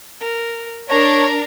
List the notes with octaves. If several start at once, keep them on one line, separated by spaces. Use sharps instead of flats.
A#4
D4 A#4 C#5 A#5